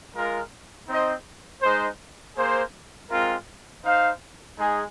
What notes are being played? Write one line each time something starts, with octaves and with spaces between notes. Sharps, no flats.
G#3 F4 A#4
C4 D#4 C5 D#5
G#3 D#4 C5
A#3 G#4 C5
G#3 C4 F4 A#4
D#4 C5 F5
G#3 D#4 G#4